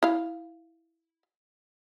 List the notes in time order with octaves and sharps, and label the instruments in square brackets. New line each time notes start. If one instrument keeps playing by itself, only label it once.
[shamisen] E4 F5